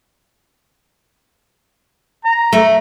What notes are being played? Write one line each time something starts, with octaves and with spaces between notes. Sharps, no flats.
A#5
A3